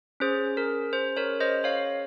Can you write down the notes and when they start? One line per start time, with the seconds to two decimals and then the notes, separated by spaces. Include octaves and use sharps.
0.20 C#4 G#4 C5
0.57 A#4
0.93 C5
1.17 A#4 C#5
1.40 C5 D#5
1.64 C#5 F5